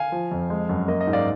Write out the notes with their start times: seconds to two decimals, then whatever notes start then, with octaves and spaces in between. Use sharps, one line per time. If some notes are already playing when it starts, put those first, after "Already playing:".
Already playing: F5 G#5
0.12 F3
0.31 F2
0.50 G#3
0.69 F#2
0.88 A#3 D#5
1.01 D#5
1.07 G#2
1.13 D5 F5